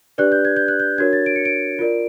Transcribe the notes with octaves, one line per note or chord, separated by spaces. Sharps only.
D4 G4 B4 D5 F#6
G6
G#6
G6
F#6
G6
D4 F#4 A#4 C#5 G#6
A6
D7
C#7
D7
F4 A#4 D5